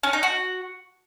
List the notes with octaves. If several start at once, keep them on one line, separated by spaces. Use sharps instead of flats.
C#4
D#4
F#4